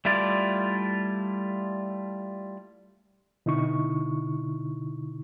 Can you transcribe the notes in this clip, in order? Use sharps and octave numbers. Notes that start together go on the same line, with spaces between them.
G3 A3 E4 F4 D5
B2 D3 D#4 E4 C#6